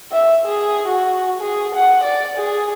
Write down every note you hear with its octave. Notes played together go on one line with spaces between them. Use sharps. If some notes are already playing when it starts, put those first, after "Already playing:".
E5
G#4
F#4
G#4
F#5
D5
G#4